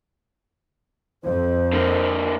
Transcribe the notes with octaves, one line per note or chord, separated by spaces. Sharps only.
F2 C5
D3 A#3